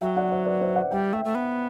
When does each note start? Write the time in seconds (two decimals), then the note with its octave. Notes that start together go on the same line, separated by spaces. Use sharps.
0.01 F#3 E5 G5
0.17 D5 F#5
0.31 C5 E5
0.46 B4 D5
0.61 C5 E5
0.76 D5 F#5
0.91 G3 E5 G5
1.13 A3 E5 G5
1.25 A3
1.35 B3